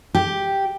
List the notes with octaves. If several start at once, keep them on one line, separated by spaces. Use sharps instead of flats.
G4